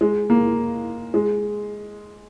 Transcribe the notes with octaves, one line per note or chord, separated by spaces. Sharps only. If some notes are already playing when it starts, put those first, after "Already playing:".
G#3
A#3
G#3